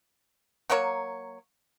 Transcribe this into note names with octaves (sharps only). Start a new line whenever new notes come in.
F#3 A#3 A#4 C#5